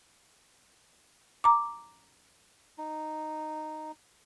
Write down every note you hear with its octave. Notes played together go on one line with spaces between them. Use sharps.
A#5 D6
D#4